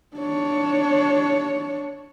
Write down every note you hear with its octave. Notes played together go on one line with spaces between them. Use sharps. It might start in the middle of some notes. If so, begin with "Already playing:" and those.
D4 C#5